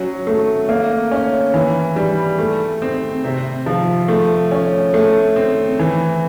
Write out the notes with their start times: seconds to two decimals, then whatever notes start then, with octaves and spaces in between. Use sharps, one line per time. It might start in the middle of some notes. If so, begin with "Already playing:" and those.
Already playing: F#3 C#4
0.27 A3
0.69 A#3
1.11 C#4
1.54 E3
1.96 G3
2.39 A3
2.82 C4
3.24 C3
3.66 F3
4.08 A3
4.51 C#4
4.94 A3
5.36 C4
5.79 E3